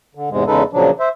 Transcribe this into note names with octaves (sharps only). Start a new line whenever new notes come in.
D3
E2 G#2 C3 G#3
E2 C#3 G#3 D#4 A4 B4
A#2 C#3 F3 F#3 D4
C5 E5